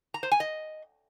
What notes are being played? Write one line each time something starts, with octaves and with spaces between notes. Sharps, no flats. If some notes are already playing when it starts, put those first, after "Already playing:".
A#5
C5
G#5
D#5